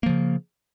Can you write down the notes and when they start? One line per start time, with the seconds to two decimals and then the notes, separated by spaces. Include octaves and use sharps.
0.03 A#3
0.06 F3
0.09 C#3